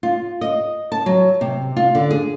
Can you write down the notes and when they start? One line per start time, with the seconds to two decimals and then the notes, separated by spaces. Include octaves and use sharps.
0.03 F4
0.41 D#5
0.92 A5
1.06 F#3
1.41 C3
1.76 F4
1.95 D3
2.11 G#4